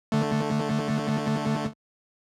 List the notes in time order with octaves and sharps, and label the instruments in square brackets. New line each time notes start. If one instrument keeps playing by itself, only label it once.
[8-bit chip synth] D3 A3